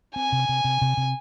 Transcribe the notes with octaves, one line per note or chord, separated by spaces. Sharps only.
C4 G#5
C3
C3
C3
C3
C3